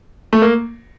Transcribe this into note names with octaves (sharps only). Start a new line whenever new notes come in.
A3
A#3